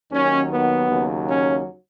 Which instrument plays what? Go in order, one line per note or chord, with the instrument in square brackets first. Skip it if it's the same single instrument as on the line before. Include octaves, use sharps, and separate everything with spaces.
[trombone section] D#2 D#3 F#3 C#4
B3
D#2 C#3 F#3
C#4